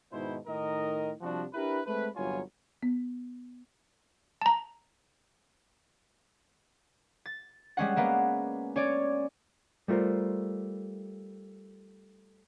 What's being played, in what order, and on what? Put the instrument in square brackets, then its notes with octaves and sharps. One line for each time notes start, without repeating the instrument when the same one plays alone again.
[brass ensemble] G#2 B2 D#3 E4 C5
A2 D#3 D#4 A#4 D#5
C3 F3 G3 D4 F#4
D4 E4 G4 A#4 B4
G#3 A3 C4 B4
G1 C2 F#3 F4 C#5 G#5
[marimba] B3
[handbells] A5 A#5
[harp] A6
G3 G#3 C#4 F#5
G#3 A#3 B3
C#4 C#5 D5
[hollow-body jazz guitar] G3 A3 F4 A#4 C5